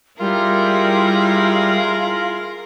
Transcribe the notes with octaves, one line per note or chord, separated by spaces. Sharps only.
G3 E4 F4 G#4 A#4 A#5